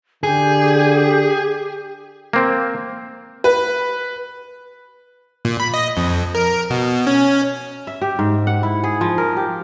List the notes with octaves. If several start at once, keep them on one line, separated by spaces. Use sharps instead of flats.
D3 G4 G#4
A#3 C4
B4
A#2
B5
D#5
F2
A#4
B2
C#4
E5
G4
G#2
F#5
E4
G#4
F3
A#4
G4